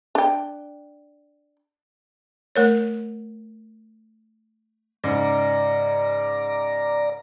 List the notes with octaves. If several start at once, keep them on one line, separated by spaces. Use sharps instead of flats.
D4 G5
A3 A#4 C#5
G#2 C#3 D5 A#5